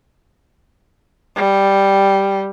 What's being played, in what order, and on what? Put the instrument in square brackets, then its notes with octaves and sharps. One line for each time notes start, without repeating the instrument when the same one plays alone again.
[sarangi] G3